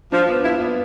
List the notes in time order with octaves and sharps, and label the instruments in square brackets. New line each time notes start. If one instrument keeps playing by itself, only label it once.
[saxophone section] F3 [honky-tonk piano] D4
[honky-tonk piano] B3
[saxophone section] E4 [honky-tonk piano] F4
[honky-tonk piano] B3